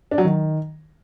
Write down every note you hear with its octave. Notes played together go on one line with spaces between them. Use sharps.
D4
F#3
D#3